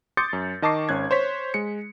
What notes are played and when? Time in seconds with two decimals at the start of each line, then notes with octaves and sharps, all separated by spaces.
0.17 C6 D6 D#6 G6 A6 C#7
0.33 F#2
0.62 D#3 D#5 A5 C#6 D6 C7
0.89 G#1 C#4 F#6 G#6
1.11 C5 C#5 B6
1.54 G#3 C#7